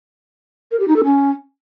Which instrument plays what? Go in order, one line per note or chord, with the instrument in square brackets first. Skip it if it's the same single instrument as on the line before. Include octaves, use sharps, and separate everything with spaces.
[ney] A#4
G4
D#4
A4
C#4